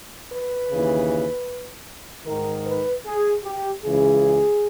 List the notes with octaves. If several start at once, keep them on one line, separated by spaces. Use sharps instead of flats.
B4
D#2 C#3 E3
G#2 D#3 A#4
B4
G#4
G4
C#2 C#3 E3 G#4